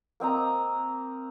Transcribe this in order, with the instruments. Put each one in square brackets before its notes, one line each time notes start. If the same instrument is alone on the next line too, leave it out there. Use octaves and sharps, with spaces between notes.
[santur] A#3 C4 D#5 A#5